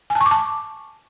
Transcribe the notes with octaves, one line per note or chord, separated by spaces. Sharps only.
G#5
A5
C#6
D6
A5